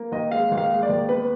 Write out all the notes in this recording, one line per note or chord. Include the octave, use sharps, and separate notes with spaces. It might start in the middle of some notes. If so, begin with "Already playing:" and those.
Already playing: A#3
D#2 D#5
G#3 F5
D#2
F5
G#3
D5
D#2
B3 B4